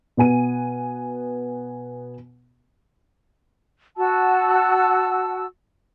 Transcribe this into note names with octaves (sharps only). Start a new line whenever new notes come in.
B2 B3 G#5 D#7
F#4 F#5 A5 E6